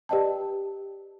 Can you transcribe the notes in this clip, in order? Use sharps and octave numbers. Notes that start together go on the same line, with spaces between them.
G4 B4 D5 D#5 G5 A5